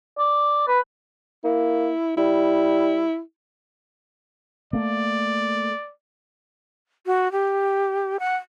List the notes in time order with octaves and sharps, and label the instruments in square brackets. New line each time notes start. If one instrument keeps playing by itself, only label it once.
[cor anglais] D5
B4
[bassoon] A#3 [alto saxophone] E4
[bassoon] G3 [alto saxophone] E4
[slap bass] A3 A#3 [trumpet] D5
[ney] F#4
G4
F#5